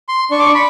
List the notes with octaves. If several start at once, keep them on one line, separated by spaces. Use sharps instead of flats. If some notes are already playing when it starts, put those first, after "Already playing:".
C6
D4 C#6
D6
C#6
B5